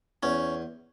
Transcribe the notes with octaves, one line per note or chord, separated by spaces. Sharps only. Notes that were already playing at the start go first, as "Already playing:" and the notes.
E2 C#4